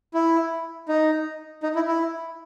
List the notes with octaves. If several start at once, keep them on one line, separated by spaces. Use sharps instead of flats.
E4
D#4
D#4
E4
E4